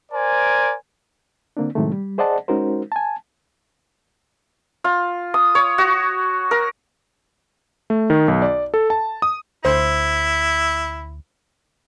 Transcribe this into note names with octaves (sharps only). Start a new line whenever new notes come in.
A#4 C5 D5 G#5
D3 A#3 C4 D4
A2 C3 D#3 F#3 G#3 A3
G3
G#4 C5 D5 D#5 F#5 A5
G#3 C#4 D#4 F#4 A#4 C5
G#5 A5
F4
D#6
C#5
F#4
A#4
A3
D#3
B1
D5
A4
A5
D#6
D2 E4 C5